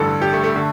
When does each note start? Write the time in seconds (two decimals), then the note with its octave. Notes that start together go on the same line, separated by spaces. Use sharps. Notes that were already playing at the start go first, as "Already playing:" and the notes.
Already playing: A1 G2 D3 A4
0.22 G4
0.33 A3
0.44 A3
0.56 D3